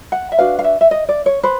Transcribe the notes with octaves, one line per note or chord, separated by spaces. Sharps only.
F#5
E5
D4 F#4 B4 F5
F5
E5
E5
D#5
D5
C#5
B4 C5